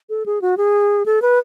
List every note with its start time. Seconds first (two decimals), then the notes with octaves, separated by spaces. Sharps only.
0.10 A4
0.26 G#4
0.42 F#4
0.57 G#4
1.06 A4
1.22 B4